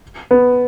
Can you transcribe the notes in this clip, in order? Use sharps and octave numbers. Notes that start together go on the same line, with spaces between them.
B3